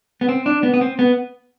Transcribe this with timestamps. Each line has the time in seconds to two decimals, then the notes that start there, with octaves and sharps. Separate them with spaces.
0.21 B3
0.29 C4
0.46 D4
0.63 B3
0.74 B3
0.81 C4
0.99 B3